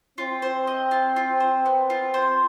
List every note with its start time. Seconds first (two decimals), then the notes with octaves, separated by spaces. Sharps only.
0.18 C4 F4
0.42 C5
0.67 D#5
0.91 F4
1.16 F4
1.40 C5
1.66 B3
1.90 F4
2.14 C5